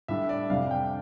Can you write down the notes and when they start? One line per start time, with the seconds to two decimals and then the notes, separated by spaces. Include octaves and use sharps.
0.08 A2 G3 D4 E5
0.29 D5
0.50 F2 C3 G3 D4 F5
0.71 G5